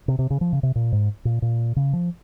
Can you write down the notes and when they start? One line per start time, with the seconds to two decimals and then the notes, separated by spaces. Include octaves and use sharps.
0.08 C3
0.19 C3
0.30 C#3
0.41 F3
0.53 C#3
0.63 C3
0.75 A#2
0.92 G#2
1.25 A#2
1.42 A#2
1.76 C#3
1.93 F3